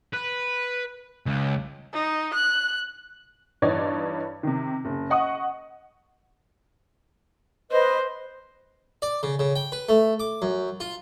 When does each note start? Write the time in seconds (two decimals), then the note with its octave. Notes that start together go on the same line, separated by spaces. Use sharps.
0.14 B4
1.26 C#2
1.93 D#4
2.34 F#6
3.62 G2 E3 D#4 C#5 D5
4.43 C3 D#3
4.85 F#1
5.10 D#5 F#5 C#6 D#6
7.71 B4 C5 D#5
9.02 D5
9.23 C#3
9.39 C#3
9.56 G5
9.72 B4
9.89 A3
10.20 D6
10.42 F#2
10.80 F4